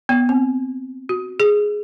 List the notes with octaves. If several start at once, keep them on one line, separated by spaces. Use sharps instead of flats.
B3
C4
F#4
G#4